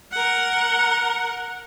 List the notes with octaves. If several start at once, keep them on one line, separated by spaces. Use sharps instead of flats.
A#4 F#5